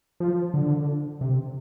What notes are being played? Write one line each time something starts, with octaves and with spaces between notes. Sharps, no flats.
F3
D3
C3